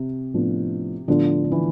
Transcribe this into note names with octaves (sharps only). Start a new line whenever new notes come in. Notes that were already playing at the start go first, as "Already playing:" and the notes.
Already playing: C3
A2 F3 B3 D4 F4
A2 D3 F3 B3 D4 F4
D3
E3